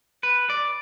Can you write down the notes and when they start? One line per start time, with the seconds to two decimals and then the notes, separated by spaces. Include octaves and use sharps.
0.23 B4
0.50 D5